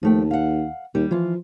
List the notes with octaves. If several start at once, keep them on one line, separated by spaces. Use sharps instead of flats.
D#2 F3 A3 G5
F5 F#5
D#2 G3
E3 F3 F4